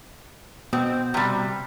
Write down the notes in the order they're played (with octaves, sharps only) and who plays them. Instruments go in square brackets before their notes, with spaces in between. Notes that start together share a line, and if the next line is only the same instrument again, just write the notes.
[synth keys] B2 [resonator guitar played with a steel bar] C4
[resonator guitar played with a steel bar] C3 G3